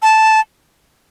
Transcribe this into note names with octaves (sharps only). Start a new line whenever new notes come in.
A5